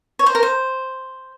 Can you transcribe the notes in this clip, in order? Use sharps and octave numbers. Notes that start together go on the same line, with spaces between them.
C#5
C5
A#4
C5